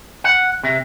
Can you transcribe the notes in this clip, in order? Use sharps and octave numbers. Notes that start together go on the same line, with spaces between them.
F#5
C3